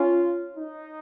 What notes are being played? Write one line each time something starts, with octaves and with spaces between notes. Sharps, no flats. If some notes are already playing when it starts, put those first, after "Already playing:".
Already playing: C#4 F4
D#4